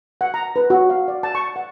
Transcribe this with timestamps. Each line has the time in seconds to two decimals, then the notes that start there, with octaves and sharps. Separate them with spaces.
0.21 F#5
0.34 A#5
0.56 B4
0.70 F#4
0.90 F5
1.08 D5
1.23 A5
1.35 C#6
1.56 F#5